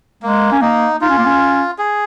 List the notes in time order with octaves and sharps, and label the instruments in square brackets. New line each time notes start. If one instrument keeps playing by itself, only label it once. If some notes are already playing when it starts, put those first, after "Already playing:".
[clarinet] G#3 [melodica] A#3
[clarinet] C#4
[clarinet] A#3 [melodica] D#4
[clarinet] D#4 [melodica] F4
[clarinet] C#4
A#3
C#4
[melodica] G#4